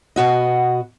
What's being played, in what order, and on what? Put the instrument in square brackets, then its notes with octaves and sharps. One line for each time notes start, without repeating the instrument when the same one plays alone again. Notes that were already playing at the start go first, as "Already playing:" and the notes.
[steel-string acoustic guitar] B2 F#4 D#5